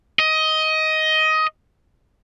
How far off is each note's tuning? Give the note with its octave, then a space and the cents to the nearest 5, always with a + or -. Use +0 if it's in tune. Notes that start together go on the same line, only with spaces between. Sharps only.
D#5 +15